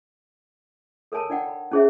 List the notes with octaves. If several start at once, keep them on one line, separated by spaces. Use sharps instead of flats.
A4 A#4 C#5 G#5 A5
D4 D#4 D5 F#5 G5
B5
C#4 D#4 G#4 C5 C#5 E5